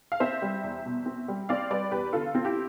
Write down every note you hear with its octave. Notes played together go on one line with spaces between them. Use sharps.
F5
C4 C5 E5
G3
E2
B2
C4
G3
C4 D5 F5
G3 B4 D5
E2 G4 B4
D3 F4 A4
C4
E4 G4